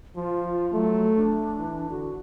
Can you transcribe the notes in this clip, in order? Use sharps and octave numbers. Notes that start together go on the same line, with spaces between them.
F3 F4
F#3 A3
D4
E3
D3 F#4